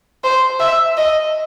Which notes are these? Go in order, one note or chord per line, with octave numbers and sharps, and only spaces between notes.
C5
E5
D#5